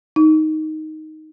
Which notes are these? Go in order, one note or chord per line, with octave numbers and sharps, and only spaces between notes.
D#4